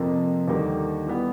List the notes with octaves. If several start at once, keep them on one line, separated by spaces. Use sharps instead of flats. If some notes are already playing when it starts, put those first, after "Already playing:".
Already playing: F2 C3 F3 A#3
D#2 D3 G3 A#3 D#4
E3 G3 B3